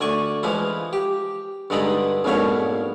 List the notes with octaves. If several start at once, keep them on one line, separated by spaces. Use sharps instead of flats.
D2 D5 G#5 C#6
E3 F3 G#3 E4
G4
G2 D3 G#3 D#4 A4 B5
A#1 F2 G#2 B2 C#5 F5